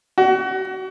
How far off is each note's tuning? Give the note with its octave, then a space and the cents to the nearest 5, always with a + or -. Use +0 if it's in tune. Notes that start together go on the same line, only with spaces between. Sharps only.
F#4 +30